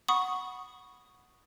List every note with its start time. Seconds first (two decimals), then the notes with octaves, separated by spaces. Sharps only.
0.08 F#5 B5 C#6 D#6